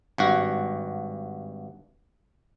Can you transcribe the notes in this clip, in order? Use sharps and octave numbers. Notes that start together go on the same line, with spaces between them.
G#1 G2 F#4